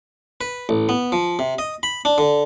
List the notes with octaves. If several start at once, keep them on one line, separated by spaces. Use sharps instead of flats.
B4
A1
B3
F3
C3
D#5
B5
D4
D3